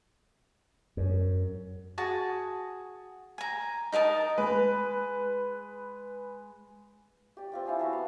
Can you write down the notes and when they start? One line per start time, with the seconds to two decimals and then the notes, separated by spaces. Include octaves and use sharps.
0.97 F#2
1.98 F#4 G#4 A5
3.38 G#5 A#5
3.92 D#4 A#4 A5 D#6
4.38 G#3 B4
7.37 G4 D5
7.52 C4 F4 G5
7.66 E4 F5 G#5 D#6
7.79 B3 F#4 E5 A5
7.93 F5 B5